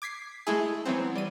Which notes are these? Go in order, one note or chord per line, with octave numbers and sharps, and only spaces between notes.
D6 G#6 B6 C7
G#3 A3 E4 G#4
E3 F#3 B3 C4
G3 D#7